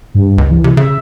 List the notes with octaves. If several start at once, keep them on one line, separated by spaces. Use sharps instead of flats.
G2
C#2
E3
C3
C#3 E5